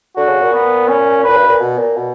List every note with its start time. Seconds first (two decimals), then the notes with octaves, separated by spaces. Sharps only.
0.16 D3 F#4
0.28 C#3
0.40 A#2
0.53 B3
0.88 C#4
1.24 A#2 B4
1.36 G2
1.48 A#2
1.60 B2
1.78 A#2
1.96 B2